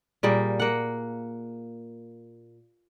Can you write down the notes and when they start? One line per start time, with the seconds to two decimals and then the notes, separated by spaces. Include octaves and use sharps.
0.23 A#2 G3 A#3 G#4
0.60 A#3 F#5